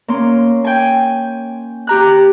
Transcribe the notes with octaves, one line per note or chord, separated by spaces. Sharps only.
A#3 C#4 C6
G5 G#5
G4 A#5 F#6